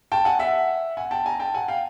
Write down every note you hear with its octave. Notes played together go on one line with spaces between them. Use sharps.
G5 A5
F#5 G#5
E5 F#5
F#5 G#5
G5 A5
G#5 A#5
G5 A5
F#5 G#5
F5 G5